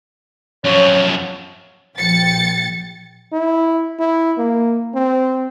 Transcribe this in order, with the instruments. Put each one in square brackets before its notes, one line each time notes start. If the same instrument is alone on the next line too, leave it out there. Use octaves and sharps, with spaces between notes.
[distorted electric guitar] F#2 F3 [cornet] C#5
[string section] A#1 F3 G5 A6 C#7
[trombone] E4
E4
A#3
C4